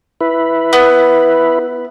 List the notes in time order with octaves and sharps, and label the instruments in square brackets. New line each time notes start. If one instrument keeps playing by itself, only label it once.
[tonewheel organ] E4 B4
[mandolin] B3